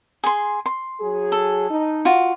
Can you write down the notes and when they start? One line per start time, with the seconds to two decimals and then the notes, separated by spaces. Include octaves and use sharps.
0.24 G#4 C6
0.66 C6
1.01 F#3 G#4
1.32 A4
1.71 D#4
2.05 F4 F#4